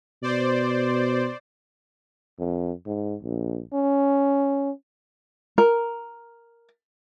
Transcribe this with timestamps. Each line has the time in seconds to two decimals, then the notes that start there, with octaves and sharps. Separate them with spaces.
0.22 B2 C5 D5
2.39 F2
2.87 G#2
3.22 A#1
3.73 C#4
5.58 A#4